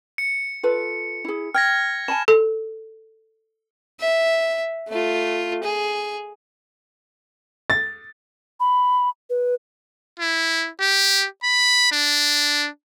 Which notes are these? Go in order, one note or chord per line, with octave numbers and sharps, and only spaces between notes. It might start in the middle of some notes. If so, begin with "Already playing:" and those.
C#7
F4 A4 B4
E4 G#4
G5 F6 G#6 A#6
G#5 A5 B5 E7
A4
E5
A3 F4
G#4
A6
B5
B4
E4
G4
B5
D4